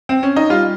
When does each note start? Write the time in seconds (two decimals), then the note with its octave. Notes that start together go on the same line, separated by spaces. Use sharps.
0.09 C4
0.23 C#4
0.36 D#4
0.50 G3 F4